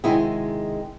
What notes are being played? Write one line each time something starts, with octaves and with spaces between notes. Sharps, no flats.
C3 D#3 G#3 E4 F#4 G#4